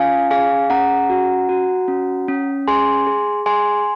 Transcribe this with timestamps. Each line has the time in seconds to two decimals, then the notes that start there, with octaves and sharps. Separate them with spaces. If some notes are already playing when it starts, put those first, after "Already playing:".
Already playing: C#4 F4 F5 G#5
0.31 G#4 F5 G#5
0.70 C#4 F#5 A#5
1.10 F#4
1.49 F#4
1.88 C#4
2.28 C#4
2.68 G#4 G#5 C6
3.07 G#4
3.46 G#4 G#5 C6